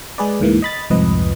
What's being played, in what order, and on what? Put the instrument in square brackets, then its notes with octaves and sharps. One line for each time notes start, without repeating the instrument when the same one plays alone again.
[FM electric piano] G#3 G#4 B4 D5
D2 G#2 E3 A#3
D#5 B5 A6
C2 F2 G#2 F3 B4 D#5